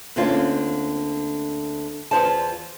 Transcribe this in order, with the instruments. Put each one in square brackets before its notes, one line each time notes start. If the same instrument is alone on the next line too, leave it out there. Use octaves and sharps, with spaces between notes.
[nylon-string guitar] D2 D3 A#3 C4 C#4 F4
E2 D3 F4 C5 D5 A5